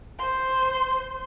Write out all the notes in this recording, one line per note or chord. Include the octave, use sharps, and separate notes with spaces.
C5 C6